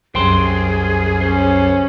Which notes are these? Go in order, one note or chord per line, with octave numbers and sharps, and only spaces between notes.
C2 F#2 G#4 C5 G5 C6
C#4 C5